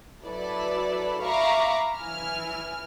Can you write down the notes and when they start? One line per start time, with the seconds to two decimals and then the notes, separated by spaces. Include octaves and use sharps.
0.24 F#3 E4 A4 B4 D5
1.23 E5 F5 A#5 B5 C#6 D6
1.98 E3 E4 G#5 F6